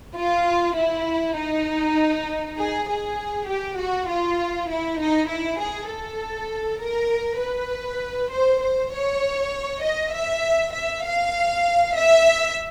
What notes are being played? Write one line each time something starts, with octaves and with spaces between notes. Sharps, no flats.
F4
E4
D#4
G#4
G#4
G4
F#4
F4
E4
D#4
E4
G#4
A4
A#4
B4
C5
C5
C#5
D#5
E5
E5
F5
E5